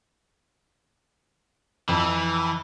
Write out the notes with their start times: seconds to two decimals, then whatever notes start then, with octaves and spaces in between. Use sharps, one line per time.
1.89 F2 E3